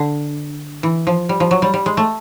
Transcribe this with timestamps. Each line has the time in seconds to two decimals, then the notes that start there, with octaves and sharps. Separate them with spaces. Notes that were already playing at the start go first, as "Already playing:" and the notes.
Already playing: D3
0.83 E3
1.07 F3
1.29 G3
1.40 F3
1.51 F#3
1.62 G3
1.74 G3
1.86 G#3
1.97 A3